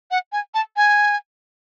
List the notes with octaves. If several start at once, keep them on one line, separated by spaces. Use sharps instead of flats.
F#5
G#5
A5
G#5